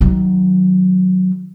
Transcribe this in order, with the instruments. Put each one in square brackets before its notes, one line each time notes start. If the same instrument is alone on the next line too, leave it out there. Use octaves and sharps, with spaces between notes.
[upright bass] D#3 F#3